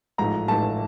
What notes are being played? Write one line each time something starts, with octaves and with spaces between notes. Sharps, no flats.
A1 G#2 F3 A3 A#5
A1 G#2 F3 A3 A5